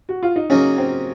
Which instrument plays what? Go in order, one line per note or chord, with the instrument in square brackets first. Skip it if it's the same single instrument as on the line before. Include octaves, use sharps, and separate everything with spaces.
[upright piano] F#4
F4
D#4
[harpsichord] C#3 F#3 A#3 D#4 [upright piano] C#4
[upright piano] C4